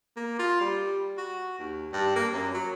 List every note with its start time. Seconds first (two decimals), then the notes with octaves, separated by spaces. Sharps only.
0.17 A#3
0.39 F4
0.61 G3
1.18 F#4
1.59 D#2
1.93 G2
2.16 A#3
2.33 F#2
2.54 F#3